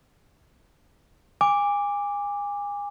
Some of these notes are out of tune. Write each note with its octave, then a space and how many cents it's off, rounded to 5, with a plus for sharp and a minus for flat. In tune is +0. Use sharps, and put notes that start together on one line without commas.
G#5 -30 D6 +0